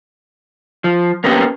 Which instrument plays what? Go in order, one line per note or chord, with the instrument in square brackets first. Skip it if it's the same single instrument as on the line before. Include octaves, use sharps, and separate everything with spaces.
[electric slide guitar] F3
A#3 B3 C#4 G4